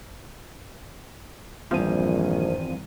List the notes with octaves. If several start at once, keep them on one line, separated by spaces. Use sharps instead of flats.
A#1 E2 G2 D#3 F3 G3 C4 D#7